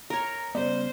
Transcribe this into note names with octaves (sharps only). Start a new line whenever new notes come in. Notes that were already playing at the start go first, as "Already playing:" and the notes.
A#4 C#5 A#5
C#3 G3 B3 C5 D5